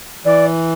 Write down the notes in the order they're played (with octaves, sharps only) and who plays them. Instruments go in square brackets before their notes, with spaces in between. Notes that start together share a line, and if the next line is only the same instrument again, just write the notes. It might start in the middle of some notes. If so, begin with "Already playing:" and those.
[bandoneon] E3 [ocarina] D5